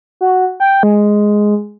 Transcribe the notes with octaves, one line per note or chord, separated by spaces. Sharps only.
F#4
G5
G#3